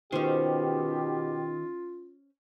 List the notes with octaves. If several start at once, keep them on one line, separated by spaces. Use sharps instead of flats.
B2 D#3 C#4 F4 G4 C5